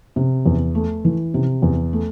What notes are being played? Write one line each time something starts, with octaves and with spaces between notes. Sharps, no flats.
C3
E2
A3
E3
C3
E2
A3